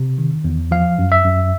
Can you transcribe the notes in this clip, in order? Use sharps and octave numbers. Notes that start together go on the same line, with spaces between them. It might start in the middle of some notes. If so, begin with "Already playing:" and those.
Already playing: C3
D#3
E2
F3 F5
F#2
E5
F#2